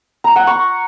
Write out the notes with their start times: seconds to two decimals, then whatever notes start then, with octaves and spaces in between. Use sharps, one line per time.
0.24 A#5
0.36 F#5
0.47 C#6